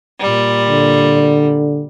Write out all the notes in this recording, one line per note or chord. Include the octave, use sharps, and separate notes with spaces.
A#2 G3
D3